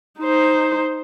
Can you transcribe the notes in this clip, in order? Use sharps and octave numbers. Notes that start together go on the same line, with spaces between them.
D#4 C5